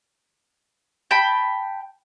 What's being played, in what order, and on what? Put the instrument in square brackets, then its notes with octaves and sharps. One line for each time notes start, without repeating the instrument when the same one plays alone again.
[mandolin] G5 A5 B5